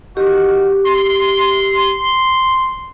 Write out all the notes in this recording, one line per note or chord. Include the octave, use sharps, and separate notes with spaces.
D#3 F#4 G4
C6